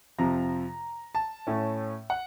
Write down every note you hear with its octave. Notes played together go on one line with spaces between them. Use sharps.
F2 C3 F3 A#5
A5
A2 A3 C#4
F#5